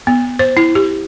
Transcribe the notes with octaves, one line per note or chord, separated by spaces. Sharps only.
B3
C5
E4
G4